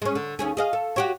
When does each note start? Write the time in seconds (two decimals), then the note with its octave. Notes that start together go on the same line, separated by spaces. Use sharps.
0.02 G#3 C#4
0.15 D3
0.39 D#2 C#4 G#4
0.57 G#4 D#5 F5
0.73 A4
0.96 F#4 G4 C#5